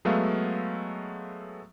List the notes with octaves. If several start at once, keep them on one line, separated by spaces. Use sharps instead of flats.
F#3 G#3 A3 B3 E5 F5